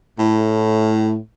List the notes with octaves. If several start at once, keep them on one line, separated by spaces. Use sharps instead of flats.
A2